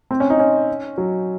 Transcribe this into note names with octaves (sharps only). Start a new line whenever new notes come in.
C4
C#4
D#4
C#4
F#3